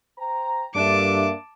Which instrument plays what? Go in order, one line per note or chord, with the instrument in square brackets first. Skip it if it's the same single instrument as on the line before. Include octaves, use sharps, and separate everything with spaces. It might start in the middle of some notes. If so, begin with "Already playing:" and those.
[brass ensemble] C5 G5 A#5
[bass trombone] G2 [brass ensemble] A#3 A4 E5 [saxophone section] D4 [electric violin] A5 D6